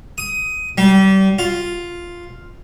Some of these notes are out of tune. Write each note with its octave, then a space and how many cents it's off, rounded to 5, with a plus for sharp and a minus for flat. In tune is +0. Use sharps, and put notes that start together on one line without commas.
D#6 +15
G3 -30
F4 +0